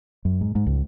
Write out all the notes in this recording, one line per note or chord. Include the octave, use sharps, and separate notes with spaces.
F#2
G#2
G#2
C#2